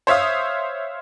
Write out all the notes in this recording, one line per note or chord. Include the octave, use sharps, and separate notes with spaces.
C5 C#5 E5 F5 D#6